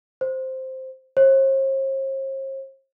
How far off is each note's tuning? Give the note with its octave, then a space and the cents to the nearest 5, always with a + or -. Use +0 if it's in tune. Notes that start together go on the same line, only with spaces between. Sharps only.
C5 +0
C5 +45